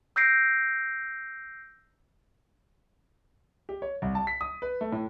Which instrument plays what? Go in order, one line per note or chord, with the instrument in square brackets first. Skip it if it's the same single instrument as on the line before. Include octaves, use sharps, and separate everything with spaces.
[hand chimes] E6 G6 A#6 C7 D7
[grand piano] G4
C#5
C2
A5
B6
D#6
B4
A3
A2